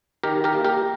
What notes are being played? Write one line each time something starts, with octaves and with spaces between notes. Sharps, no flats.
D#3 G4 A#4
G4 A#4
A#3
G4 A#4